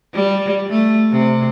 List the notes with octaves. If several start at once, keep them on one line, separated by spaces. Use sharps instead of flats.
G3
A3
C3